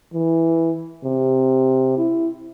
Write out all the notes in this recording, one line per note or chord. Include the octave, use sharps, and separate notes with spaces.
E3
C3
E4